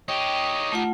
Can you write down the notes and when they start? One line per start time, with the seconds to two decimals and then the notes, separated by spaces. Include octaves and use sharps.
0.08 D#4 G4 C#5 D#5 G5
0.72 A3 F4 F#5